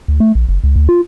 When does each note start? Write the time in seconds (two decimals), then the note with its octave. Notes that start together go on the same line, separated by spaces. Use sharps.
0.08 D2
0.20 A3
0.35 A#1
0.49 F#1
0.64 C#2
0.76 D2
0.89 F4